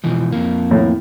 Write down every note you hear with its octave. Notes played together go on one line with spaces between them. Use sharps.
B2 E3 F3
F2 A#3
A2